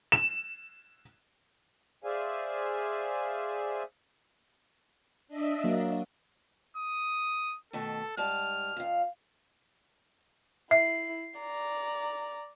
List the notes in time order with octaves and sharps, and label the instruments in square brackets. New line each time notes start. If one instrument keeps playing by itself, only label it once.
[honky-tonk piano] E7
[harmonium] G#4 C5 D5 E5 F5 G#5
[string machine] D4 D#5 E5
[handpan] F#3 A#3
[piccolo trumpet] D#6
[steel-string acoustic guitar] B2 D#3 A3 [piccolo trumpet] A4
[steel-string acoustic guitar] G#2 G3 A5 [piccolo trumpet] F6
[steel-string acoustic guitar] F2 F5
[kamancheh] E4 [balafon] E5 [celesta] C7
[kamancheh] D5 A#5